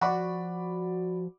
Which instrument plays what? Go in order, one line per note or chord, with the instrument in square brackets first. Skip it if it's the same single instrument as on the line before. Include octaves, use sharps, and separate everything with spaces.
[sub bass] F3 [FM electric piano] F#4 [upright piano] D5 B5 D6